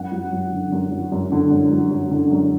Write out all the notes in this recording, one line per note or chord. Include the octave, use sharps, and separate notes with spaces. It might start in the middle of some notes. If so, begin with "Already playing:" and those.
Already playing: F#2 F#5
F#3
F#2
D3
F#2
F#3
F#2
D3
F#2
F#3
F#2
D3
F#2